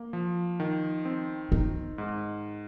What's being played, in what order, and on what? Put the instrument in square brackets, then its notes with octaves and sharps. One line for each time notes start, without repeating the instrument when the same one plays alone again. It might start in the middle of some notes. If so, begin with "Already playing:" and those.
Already playing: [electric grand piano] A#3
F3
D#3
C4
[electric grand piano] D#3 [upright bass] D#4
[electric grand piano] G#2